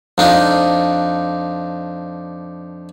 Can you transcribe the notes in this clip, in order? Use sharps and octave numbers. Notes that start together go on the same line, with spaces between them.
F2 D4 D#4